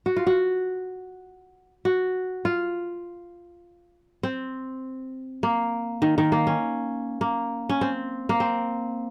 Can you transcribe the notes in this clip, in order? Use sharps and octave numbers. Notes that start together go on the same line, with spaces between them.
F#4
F4
F#4
F#4
F4
C4
A#3
D#3
D#3
A#3
C#4
A#3
C#4
C4
A#3
C4